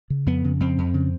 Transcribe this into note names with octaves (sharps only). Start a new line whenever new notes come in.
C#3
F2 B3
C#3
F2 C4
F2
C#3